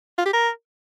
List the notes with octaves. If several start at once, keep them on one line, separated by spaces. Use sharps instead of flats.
F4
G4
A#4